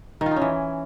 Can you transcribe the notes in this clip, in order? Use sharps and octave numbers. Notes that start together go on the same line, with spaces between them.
D#3
F4
D#4
C#4
E3